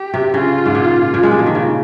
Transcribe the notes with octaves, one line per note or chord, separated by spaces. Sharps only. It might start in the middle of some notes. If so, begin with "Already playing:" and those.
Already playing: G4
C3
C#3 F4
G#2
A#2
A#2
G#3
G3
F3
D#3
C#3